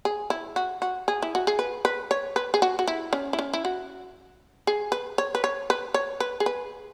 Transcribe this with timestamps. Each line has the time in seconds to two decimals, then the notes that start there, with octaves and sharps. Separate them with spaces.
0.05 G#4
0.30 E4
0.56 F#4
0.82 F#4
1.08 G#4
1.22 E4
1.35 F#4
1.47 G#4
1.59 B4
1.85 B4
2.11 C#5
2.36 B4
2.54 G#4
2.62 F#4
2.79 F#4
2.88 E4
3.13 C#4
3.33 E4
3.39 C#4
3.54 E4
3.65 F#4
4.67 G#4
4.92 B4
5.18 C#5
5.35 B4
5.44 C#5
5.70 B4
5.94 C#5
6.20 B4
6.40 G#4
6.46 B4